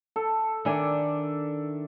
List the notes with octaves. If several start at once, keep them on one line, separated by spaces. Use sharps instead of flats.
A4
D#3 D4 D5 E5 G#5